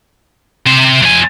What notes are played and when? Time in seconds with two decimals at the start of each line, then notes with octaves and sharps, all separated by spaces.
0.66 C3 C5
1.02 F2 G#5